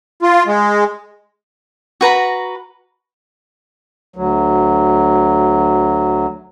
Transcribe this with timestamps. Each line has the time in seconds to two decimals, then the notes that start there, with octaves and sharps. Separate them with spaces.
0.22 F4
0.47 G#3
2.01 F#4 B4 A#5 B5
4.16 D2 F#3